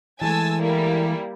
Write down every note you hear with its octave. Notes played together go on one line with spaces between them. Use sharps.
E3 G#3 A3 G#5 A5 E6
G3 A#3 E4